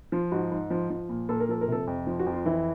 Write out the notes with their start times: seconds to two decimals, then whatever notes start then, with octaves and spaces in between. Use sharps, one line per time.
0.12 F3 F4
0.32 G#2 F#4
0.51 G#2
0.70 F3
0.90 F3
1.09 A#2
1.29 A#2 A4
1.40 A#4
1.49 F3 A4
1.61 A#4
1.68 C3 A4
1.87 F2
2.07 F3
2.19 F#4
2.26 F2
2.33 F4
2.46 E3 E4